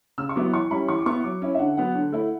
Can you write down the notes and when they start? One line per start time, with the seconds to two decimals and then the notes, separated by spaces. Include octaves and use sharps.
0.18 C#3 E6
0.29 C#6
0.36 F#3 B3 E4 D6
0.53 E3 C#6
0.71 G3 C#4 E4 B5
0.88 E3 C#6
0.99 D6
1.06 B3 E4 C#6
1.24 F#3 D6
1.42 C#4 E4
1.55 E5
1.59 D3 F#5
1.77 F#3 B3 F#5
1.95 D3
2.12 A3 E4